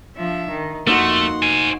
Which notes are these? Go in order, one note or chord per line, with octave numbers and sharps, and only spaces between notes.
F3 D4 E5
D#3
F2 A3 A#3 D#4 F#4 F#5 C6
C5 G#5